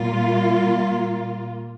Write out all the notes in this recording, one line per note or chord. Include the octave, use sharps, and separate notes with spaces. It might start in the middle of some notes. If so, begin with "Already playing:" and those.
Already playing: A#2 G3 A#3 F4